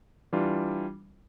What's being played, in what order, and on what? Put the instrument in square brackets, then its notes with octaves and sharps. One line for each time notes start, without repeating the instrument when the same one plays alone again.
[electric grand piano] E3 G3 D4 F4